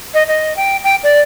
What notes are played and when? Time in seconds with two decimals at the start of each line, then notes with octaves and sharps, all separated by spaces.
0.14 D#5
0.28 D#5
0.57 G5
0.84 G5
1.03 D5